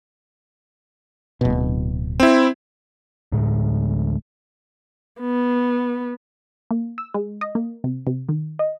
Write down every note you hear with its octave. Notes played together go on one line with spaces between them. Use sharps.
D1 B2
C4 E4
D2 A2 G#3 A3
B3
A#3
E6
G#3
D#5
A#3
C3
C3
D#3
D#5